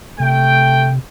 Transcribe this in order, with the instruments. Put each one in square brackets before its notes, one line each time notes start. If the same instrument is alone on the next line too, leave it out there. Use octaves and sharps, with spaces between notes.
[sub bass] C3 [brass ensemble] A3 G5